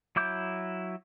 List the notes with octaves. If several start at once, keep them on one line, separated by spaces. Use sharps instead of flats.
F#3 E4 D6 G6